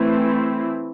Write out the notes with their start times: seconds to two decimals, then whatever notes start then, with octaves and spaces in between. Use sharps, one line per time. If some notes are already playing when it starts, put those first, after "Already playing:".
Already playing: E3 A3 C4 E4